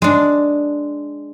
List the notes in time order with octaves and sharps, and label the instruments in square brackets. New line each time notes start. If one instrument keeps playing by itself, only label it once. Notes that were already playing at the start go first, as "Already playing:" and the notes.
[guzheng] G#3 D4